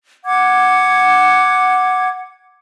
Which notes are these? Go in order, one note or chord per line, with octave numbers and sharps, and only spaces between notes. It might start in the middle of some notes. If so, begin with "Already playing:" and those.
F#5 D6 G#6